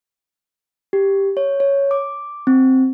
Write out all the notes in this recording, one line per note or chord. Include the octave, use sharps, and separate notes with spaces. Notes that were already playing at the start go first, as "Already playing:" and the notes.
G4
C#5
C#5
D6
C4